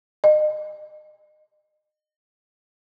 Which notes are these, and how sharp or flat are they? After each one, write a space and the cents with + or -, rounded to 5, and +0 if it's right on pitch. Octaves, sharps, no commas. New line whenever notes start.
D#5 -30